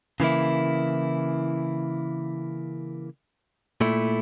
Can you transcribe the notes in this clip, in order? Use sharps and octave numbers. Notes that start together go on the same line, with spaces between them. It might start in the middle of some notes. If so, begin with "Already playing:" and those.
C#3 E3 A#3 E4
A#2 A3 E4